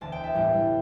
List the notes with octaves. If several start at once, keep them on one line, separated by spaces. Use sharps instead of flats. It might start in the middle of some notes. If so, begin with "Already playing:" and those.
E1 D2 D3 A5
G5
E5
B1 A2 E3 G3